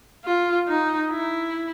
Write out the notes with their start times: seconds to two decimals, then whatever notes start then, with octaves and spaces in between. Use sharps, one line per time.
0.25 F4
0.68 D#4
1.11 E4